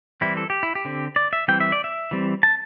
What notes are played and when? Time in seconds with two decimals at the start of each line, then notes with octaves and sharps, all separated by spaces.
0.21 E3 G3 C4 E4
0.37 A4
0.50 G4
0.63 E4
0.75 G4
0.85 D3 C4
1.16 D5
1.33 E5
1.48 E3 G3 C4 G5
1.61 E5
1.72 D5
1.84 E5
2.11 E3 G3 C4
2.43 A5